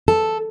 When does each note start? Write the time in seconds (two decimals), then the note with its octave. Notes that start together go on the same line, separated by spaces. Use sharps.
0.08 A4